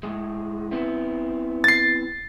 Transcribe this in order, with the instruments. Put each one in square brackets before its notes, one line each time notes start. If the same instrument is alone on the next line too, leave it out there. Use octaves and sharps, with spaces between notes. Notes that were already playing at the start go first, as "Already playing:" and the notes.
[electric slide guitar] A2 G#3
B3 C4 E4
[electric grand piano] A6 C7